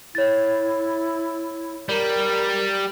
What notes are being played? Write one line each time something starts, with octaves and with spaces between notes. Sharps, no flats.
E4 C#5 A6
G3 A#4